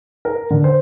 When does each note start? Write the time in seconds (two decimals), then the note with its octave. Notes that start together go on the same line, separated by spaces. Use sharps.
0.25 A#4
0.50 D3
0.64 C5